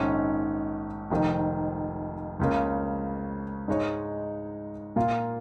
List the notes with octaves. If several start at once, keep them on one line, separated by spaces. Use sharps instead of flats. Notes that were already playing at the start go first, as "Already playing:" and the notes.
Already playing: A#1 G#2 D#3 C#4
F1 F2 D#3
C#2 C#3 A#3
G#2 G#3 D#4 C#5
A#2 A#3 F4